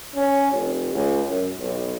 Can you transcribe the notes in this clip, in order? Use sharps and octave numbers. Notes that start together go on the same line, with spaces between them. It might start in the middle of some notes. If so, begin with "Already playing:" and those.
C#4
F1
C#2
F#2
B1